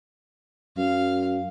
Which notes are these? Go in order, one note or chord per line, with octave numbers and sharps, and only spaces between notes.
F#2 F5